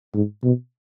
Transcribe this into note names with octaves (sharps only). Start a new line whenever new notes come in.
G#2
B2